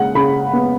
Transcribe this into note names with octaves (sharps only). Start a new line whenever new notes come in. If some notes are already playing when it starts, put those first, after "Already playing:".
Already playing: C#3 G#3 F#5
C#3 B5
B3